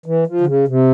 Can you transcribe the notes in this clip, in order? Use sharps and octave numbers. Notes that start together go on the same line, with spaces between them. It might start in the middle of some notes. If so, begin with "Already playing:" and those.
E3
F3
D3
C#3
C3